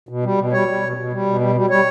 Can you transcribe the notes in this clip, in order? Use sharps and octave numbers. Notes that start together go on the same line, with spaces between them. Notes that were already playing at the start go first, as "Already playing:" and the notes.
B2
G3
B2
G3 C#5
G3
B2
B2
G3
B2
G3
G3
G3 C#5